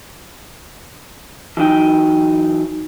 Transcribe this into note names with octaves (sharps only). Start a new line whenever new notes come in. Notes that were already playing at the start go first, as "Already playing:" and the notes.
E3 F#3 D#4 G5